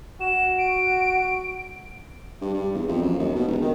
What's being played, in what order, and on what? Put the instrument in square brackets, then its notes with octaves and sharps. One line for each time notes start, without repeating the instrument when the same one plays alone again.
[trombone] F#4 [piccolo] E7
[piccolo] D7
[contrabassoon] G2
G2
E2
F2
F#2
D#2
B2
E1
D#3